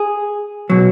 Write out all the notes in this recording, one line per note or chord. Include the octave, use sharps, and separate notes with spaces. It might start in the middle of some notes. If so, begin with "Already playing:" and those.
Already playing: G#4
B2 F#3